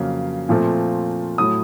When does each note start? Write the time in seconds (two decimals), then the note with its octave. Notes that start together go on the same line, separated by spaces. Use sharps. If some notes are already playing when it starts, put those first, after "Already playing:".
Already playing: F2 C#3 F#3 A#3
0.49 A#2 F3 A3 C4
1.38 A2 F#3 A3 D#6